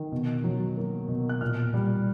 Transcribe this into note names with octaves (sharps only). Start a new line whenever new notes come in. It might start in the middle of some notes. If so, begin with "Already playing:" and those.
Already playing: D#3
B2
F#3
A#3
B2
F#6
A#2 F6
G3